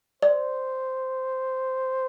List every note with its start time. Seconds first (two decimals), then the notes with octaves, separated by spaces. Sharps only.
0.22 C5 D5